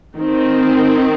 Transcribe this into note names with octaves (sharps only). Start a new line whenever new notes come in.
D#3 C4